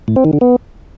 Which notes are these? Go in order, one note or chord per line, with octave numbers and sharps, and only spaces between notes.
A2
C4
D#3
D3
B3